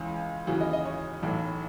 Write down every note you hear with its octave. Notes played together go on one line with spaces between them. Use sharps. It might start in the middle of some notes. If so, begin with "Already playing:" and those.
Already playing: C#2 C#3 E3 G#4
D#2 C#3 E3 F#4
D#5
D#5
C#5
B1 A2 E3